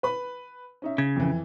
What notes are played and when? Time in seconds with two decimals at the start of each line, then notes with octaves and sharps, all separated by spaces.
0.03 B4 B5
0.82 C#4 D#4 E5
0.98 C#3 G#6
1.16 F2 E3